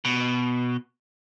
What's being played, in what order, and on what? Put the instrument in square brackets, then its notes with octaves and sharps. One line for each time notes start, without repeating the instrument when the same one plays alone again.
[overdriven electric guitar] B2